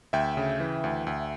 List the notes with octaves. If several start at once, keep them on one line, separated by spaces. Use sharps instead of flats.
D2 E5 G5
C#3
E3
D2
D2